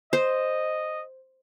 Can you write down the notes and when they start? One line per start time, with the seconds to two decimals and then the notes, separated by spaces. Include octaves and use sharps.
0.13 C5 D#5